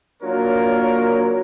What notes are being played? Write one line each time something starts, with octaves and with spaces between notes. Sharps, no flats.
F#3 A#3 D4 F4 A#4 C#5